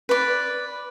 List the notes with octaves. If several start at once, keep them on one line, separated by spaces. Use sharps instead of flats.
B4 D5